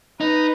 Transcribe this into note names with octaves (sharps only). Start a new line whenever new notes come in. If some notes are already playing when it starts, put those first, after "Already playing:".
D#4 B4